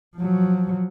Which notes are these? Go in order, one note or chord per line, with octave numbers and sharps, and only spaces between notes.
F3 F#3